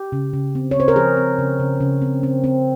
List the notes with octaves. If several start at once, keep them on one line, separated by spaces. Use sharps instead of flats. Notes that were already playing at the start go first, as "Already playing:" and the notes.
Already playing: G4
C#3
C#3
C4
C#5
C4 C5
A#4
F3 G#4
C4
C#3
C#3
C#3
C4
C4
C4